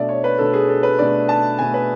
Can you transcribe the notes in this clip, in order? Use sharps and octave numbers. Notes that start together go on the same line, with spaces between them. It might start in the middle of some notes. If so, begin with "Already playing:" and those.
Already playing: B2 A3 D4 D5 E5
C#5
B4
B2 A3 D4 A4
G#4
A4
B4
B2 A3 D4 D5
A5
B2 A3 D4 G#5
B4